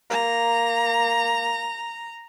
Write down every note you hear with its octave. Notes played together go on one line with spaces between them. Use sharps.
A#3 A#5